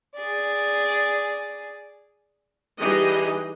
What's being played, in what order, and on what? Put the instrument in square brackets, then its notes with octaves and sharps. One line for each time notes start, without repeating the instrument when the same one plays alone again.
[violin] G#4 D5
[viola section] E3 G3 D#4 G4 G#4 D#5